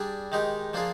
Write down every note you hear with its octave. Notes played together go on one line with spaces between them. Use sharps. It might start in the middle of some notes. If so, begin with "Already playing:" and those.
Already playing: G3 D4 G#4
D#3 G#3 D#4 G4
F3 A#3 D4 F4 G#4